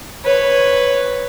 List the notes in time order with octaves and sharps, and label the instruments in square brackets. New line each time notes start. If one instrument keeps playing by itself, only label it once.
[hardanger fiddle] B4 C#5